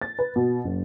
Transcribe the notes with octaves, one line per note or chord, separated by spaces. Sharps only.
A6
B4
B2
F#1